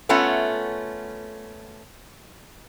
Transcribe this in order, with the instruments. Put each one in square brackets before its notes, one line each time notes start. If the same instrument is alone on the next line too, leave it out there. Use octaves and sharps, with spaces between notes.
[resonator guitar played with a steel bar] A3 B3 C#4 F4 F#5